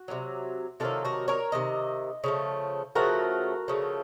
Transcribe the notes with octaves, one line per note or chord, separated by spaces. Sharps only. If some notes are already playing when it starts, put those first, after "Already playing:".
Already playing: F#4
C3 D#3 F#3
C3 D#3 F#3 F4 A4
F#4 A#4
A#4 C#5
C3 D#3 D#5
C#3 F3 A3
C#3 F3 A3 F#4 A#4
C#3 F3 A3